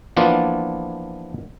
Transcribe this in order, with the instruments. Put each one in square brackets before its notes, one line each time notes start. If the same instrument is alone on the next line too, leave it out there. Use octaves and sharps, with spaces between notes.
[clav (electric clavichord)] E3 F3 A#3 B3 D4 F4